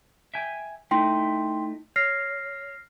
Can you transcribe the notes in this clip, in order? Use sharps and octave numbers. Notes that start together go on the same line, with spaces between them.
E5 G5 G#5
A3 D#4 E4 G5 C6
C#5 F6 A#6 C7